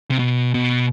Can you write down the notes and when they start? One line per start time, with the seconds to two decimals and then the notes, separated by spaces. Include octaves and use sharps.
0.11 C3
0.19 B2
0.54 B2